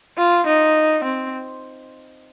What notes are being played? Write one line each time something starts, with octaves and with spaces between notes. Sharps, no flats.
F4
D#4
C4